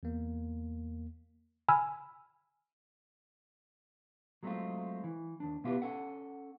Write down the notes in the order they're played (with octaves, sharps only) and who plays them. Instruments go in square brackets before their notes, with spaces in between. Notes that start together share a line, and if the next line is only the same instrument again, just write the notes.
[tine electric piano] E2 A#3
[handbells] G#5 B5 E6 F6
[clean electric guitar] F#3 G#3 A3 B3 C4 F4
E3
D#2 D4
B2 B3 E4 F4 G4 B4
C#4 A4 F#5